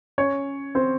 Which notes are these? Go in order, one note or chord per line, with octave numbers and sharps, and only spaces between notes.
C#4 C#5
C4 C5